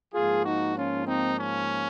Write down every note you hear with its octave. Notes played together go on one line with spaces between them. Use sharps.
G#2 F3 A#3 F4 G#4
D#4 F#4
C#4 F4
C4 D#4
C#4